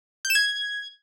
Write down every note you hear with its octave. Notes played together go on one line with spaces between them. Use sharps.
G6
E7
G#6